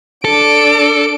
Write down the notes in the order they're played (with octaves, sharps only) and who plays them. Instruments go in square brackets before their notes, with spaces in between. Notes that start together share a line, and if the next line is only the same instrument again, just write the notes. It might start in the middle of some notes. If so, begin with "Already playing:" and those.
[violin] D4 D7 [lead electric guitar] A4